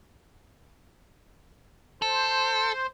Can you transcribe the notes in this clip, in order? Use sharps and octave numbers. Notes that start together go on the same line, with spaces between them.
A4 C5